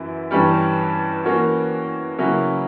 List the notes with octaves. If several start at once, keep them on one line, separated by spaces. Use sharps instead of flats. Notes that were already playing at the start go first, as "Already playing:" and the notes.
Already playing: F#2 E3 E4
G2 E3 G3 C#4
E3 A#3 C#4 F#4
C#3 F#3 A#3 C#4 E4